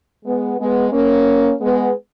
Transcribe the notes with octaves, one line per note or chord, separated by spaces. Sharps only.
G#3 B3
G#3 B3
A#3 C#4
G#3 B3